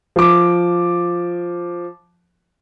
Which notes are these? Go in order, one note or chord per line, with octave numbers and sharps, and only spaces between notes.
F3 D6